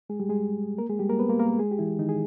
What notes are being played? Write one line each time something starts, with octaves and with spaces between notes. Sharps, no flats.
G#3 G#4
G3 G4
G#3 G#4
A#3 A#4
G#3 G#4
G3 G4
A#3 A#4
B3 B4
A#3 A#4
A#3 A#4
G#3 G#4
G4
E3 E4
D#3 D#4
G#4